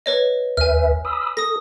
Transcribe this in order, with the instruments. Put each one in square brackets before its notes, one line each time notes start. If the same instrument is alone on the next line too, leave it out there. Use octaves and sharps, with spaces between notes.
[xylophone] B4 C#5 D#5
[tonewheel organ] D#2 B4 E5 [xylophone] G#5 F6
[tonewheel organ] B5 D#6 E6
[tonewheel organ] A4 [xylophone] D#6 A#6